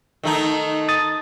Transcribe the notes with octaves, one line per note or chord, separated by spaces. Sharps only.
D#3 A3 D#4
D#6 A6